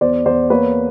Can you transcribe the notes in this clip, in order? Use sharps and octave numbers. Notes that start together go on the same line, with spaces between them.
E2 C5 D5
E2 C5 D5
A#3 B4 C#5